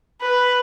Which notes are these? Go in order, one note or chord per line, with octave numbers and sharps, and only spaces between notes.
B4